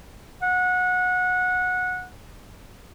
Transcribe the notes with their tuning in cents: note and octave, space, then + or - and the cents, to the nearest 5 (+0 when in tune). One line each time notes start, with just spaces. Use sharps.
F#5 -20